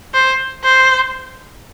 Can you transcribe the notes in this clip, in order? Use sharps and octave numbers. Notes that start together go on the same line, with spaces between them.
C5
C5